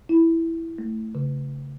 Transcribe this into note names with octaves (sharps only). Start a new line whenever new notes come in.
E4
A3
C#3